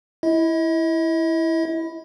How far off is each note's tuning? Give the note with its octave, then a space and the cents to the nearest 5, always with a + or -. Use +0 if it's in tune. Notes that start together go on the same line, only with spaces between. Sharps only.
E4 +0 D#5 +40